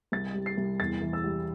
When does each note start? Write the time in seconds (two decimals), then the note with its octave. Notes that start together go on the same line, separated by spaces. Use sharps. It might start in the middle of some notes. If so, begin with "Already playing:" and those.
0.12 C2 A6
0.34 G3
0.46 C7
0.57 C2
0.80 E2 A6
1.01 E3
1.13 E6
1.24 G3